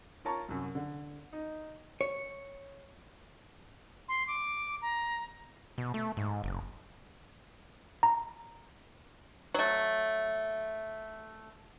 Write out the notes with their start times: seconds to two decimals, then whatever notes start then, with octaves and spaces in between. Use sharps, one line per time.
0.25 F4 A#4 C#5 A5 A#5 C#6
0.49 C2 F#2
0.75 D3
1.33 D#4
2.01 C#5
4.08 C6
4.27 D6
4.82 A#5
5.78 B2
5.94 A3
6.17 G#2
6.44 F#1
8.03 A#5
9.54 F#3 A3